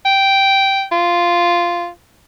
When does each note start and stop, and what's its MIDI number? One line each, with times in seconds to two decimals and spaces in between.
0.05 0.83 79
0.92 1.88 65